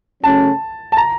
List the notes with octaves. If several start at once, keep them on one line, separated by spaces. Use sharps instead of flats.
C#3 F#3 A3 C#4 A5
A5
A#5